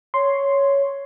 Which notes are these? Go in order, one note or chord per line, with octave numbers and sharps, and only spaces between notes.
C#5 C6